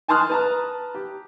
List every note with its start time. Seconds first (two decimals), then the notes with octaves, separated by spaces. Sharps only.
0.08 G#5 A5 C6 D#6 F6 F#6
0.30 B4 A5 A#5
0.95 G4